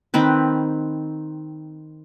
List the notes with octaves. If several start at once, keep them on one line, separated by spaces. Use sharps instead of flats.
D#3 C4 B4